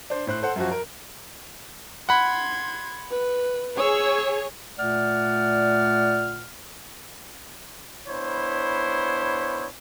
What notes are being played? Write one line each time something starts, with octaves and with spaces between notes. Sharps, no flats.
D4 C5
A2 C5 F#6
A4 C5 F#5
F#2 F3 F#4
A#4
F#5 B5 C6 G#6
B4
G#4 C#5 E6
A#2 A3 D5 F#5 F6
B3 D4 E4 C5 C#5